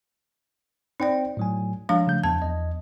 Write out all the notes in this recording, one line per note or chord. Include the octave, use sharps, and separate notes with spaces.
C4 D#4 C5 D5 G5
A2 F#3 G#5
F3 G3 G#3 D4 F5
C#3 A3 G6
E2 A5 G#6
E2 D#5